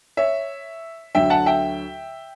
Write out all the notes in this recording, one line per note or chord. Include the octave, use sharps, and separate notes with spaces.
C#5 E5
D2 D3 F#3 E5 G5
F#5 A5
E5 G5